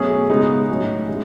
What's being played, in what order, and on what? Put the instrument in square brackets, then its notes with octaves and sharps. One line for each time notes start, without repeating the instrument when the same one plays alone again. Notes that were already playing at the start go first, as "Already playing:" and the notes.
Already playing: [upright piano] B2 F#3 A3 C#4 G#4
C#3 G#3 B3 D#4
A2 F#3 C#4
E3 G#3